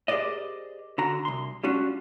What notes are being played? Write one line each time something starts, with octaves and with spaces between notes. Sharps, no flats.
G4 G#4 A#4 C5 D5 D#5
D3 F#4 A#5
C2 C6
G3 G#3 C#4 D4 F4 F#4